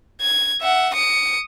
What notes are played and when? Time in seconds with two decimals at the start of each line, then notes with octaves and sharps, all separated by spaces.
0.21 G#6
0.61 E5 F#5
0.94 D#6 C#7